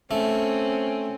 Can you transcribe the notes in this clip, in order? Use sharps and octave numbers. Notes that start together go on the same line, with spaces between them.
A3 C4 C#4